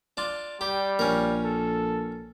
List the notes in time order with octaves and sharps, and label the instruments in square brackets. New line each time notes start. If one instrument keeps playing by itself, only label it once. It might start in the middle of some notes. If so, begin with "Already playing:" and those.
[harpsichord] D4 F4
[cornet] G3 [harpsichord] G4
[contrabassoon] A#1 [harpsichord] C#4 A#4
[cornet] A4